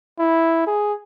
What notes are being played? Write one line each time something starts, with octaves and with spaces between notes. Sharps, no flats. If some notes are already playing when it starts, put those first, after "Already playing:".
E4
G#4